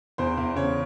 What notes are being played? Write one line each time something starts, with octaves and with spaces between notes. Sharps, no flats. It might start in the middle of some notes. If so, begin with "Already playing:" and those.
E2 C5
E2
C#3 C#5